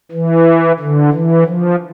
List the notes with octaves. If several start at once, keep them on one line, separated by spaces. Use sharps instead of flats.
E3
D3
E3
F3